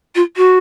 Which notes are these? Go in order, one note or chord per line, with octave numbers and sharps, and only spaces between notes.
F4
F#4